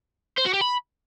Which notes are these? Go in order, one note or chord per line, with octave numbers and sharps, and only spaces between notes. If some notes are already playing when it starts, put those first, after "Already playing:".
C5
F#4
G4
B5